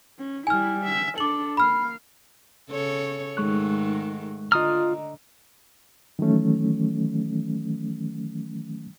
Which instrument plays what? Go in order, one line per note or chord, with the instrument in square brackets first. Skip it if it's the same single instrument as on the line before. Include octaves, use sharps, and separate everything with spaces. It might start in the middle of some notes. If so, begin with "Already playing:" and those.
[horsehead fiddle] C#4
[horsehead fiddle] G3 E4 [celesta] G#5 F6
[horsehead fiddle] E5
[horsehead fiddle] D4 A4 [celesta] D6 F#7
[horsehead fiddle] A#3 F5 [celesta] B5 F6
[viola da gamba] C#3 A4 C#5
[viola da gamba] G#2 D#3 A3 [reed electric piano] G#3 C#6 F#6
[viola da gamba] D3 [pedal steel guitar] F4 D#6 F6 [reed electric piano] D#5 A#5
[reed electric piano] D#3 E3 F#3 A3 C#4